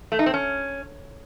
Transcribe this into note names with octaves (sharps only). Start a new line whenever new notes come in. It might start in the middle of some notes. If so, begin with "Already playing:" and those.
A3
D#4
C4
C#4